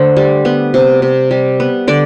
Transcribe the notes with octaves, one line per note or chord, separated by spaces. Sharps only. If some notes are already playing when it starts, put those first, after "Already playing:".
Already playing: D3 A3 C5
G3
B3
C3
C3
G3
B3
D3 D5